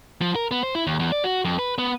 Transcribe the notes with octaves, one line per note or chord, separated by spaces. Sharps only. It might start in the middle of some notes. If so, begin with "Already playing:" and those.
F3
A#4
B3
C5
E4
D#2
E2
D5
F#4
F2
B4
B3